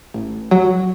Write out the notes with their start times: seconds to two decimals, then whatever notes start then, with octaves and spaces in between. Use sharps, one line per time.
0.14 A1
0.51 F#3